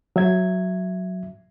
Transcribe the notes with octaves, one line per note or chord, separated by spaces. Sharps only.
F#3 E5 G#6